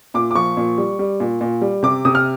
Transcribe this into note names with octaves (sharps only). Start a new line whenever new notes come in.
A#2 D6
D6
F3 C#6
A#2
G3
G3
A#2
A#2
G3
C3 D6
C3 D#6
F6